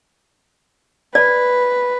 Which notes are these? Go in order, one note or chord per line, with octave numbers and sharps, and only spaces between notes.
B4 D5